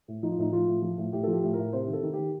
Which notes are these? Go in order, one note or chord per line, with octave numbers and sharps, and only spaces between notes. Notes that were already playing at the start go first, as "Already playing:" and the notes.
A2
F3 D#4
F4
A2 D#4
F3 F4
A2
F3
A2
A2 G4
F3 A4
G4
A2
A2 A#4
C3 C5
D#3
A4
D#3
G4
D#3